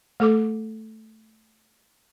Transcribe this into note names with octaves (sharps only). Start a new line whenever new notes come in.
A3 A4 D6